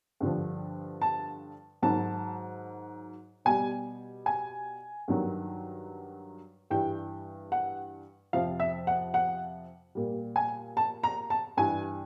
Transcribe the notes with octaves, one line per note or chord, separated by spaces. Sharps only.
G2 D3 F3
A5
G#2 D#3 F#3 A5
B2 G3 G#5
G#5
G2 D#3 F#3
G2 E3 G3 G5
F#5
F2 C3 F3 F5
E5
F#5
F#5
A#2 G3
G#5
A5
A#5
A5
G2 E3 G3 G#5